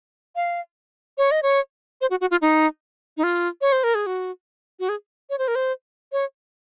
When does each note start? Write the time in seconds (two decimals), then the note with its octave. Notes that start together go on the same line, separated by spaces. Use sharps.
0.36 F5
1.18 C#5
1.31 D#5
1.43 C#5
2.01 C5
2.10 F#4
2.21 F#4
2.31 F4
2.42 D#4
3.17 D#4
3.23 F4
3.61 C#5
3.72 C5
3.84 A#4
3.95 G#4
4.06 F#4
4.80 F#4
4.89 G#4
5.30 C#5
5.38 C5
5.48 A#4
5.55 C5
6.12 C#5